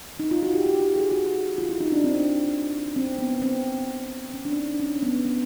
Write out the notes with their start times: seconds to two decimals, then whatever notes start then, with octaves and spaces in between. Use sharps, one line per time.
0.19 D#4
0.31 F4
0.43 F#4
0.54 G4
0.66 G4
0.81 G4
0.96 G#4
1.11 F#4
1.58 F4
1.69 E4
1.80 D#4
1.92 D4
2.04 C4
2.96 C4
3.18 B3
3.42 C4
4.34 C#4
4.45 D4
4.56 D#4
4.79 C#4
5.03 B3
5.25 B3